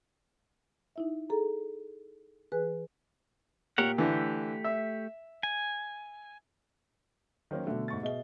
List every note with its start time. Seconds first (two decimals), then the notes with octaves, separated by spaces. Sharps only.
0.96 D#4 E4 E5
1.30 G#4 A4 A#5
2.52 E3 G#4 B4 G#5 F#6
3.78 A#2 G4 A#4 C#5 F#5
3.98 D3 E3 A3 G4
4.64 E5
5.43 G#5
7.51 D#3 F#3 A#3 C#4 C5
7.67 B2 D3 A3
7.88 G#2 C#6 A6
8.03 B2 G#4 D#5 E5 G7